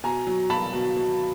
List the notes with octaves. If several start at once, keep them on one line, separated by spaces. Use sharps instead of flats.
B2 G#5 A#5
F#3
B2 A5 B5
B2
B2